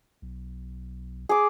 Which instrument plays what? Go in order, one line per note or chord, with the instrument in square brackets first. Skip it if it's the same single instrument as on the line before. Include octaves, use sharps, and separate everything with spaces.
[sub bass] B1
[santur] G#4 D6